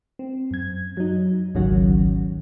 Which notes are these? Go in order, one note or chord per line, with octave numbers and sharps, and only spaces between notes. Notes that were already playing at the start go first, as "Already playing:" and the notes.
C4
F#2 G#6
F#3 D#4
G#1 C#2 D#3 F#3 C#4 F#4